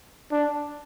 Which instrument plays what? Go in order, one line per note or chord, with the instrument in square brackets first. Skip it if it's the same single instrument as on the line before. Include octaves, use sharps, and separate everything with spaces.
[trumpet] D4